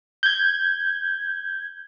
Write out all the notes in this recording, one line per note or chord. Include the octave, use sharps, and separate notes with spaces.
G6 G#6